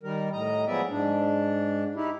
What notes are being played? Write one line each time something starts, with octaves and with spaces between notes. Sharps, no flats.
D#3 G3 A#4
A2 D#5 A#5
F3 F#3 G#3 B3 D5 E5
G#2 D4
D#4 E4 G4